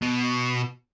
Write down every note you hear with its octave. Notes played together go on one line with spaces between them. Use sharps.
B2